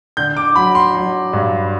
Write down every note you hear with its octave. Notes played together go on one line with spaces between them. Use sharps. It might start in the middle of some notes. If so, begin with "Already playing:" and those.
D3 G6
D6
F#3 B5
C6
F#3
G2